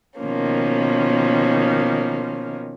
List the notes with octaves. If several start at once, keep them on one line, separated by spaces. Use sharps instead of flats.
B2 D#3 F3 A#3 C#4